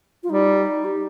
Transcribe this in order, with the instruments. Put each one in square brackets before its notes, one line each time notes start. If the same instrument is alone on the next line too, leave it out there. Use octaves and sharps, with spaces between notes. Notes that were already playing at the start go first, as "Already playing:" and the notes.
[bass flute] F4
[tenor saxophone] G3 [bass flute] D#4
[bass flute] G4